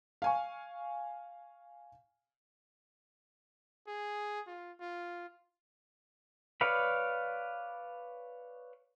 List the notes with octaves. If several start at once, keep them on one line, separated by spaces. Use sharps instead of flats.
F5 G#5 C#6
G#4
F4
F4
B4 C#5 D5 F5 B5